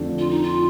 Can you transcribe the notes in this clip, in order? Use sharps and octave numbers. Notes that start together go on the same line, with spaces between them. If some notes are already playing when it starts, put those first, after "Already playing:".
Already playing: F2 D3 F3 A3 D4
F4
D#4
F4